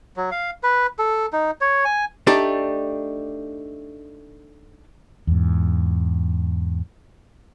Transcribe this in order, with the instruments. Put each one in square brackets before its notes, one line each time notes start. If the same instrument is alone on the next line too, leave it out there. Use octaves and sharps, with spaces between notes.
[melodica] F#3
F5
B4
A4
D#4
C#5
G#5
[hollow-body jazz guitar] A3 D4 D#4 G4
[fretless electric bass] E2 G#2